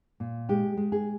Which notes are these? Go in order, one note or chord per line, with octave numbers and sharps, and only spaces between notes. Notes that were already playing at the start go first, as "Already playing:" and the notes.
A#2
G#3 G4
G#3
G#4